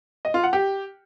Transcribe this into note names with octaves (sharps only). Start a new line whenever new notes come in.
D#5
F4
F#5
G4